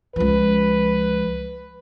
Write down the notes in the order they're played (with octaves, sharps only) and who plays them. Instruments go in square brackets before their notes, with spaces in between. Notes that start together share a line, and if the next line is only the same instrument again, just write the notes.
[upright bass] C#2 F3 [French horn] B4